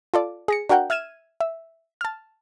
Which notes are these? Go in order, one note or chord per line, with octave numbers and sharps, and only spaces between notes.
F4 A4 D5
G#4 A#6 C#7
D4 F#4 A#4 F#5 G5
E5 F6 G#6 D#7 E7
E5
A5 F6